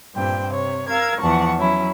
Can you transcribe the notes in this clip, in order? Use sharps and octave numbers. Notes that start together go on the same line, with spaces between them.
G2 A#2 C4 G5
C3 C#5
A#4 F5 E6 G#6
E2 F3 F#5 A5 C#6
F#3 C#4 E4